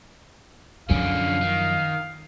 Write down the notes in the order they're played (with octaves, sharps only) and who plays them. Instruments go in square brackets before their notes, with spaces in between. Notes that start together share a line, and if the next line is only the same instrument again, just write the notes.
[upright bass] F#2 F3 [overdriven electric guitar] D3 C#4 [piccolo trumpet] F5
[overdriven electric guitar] D#3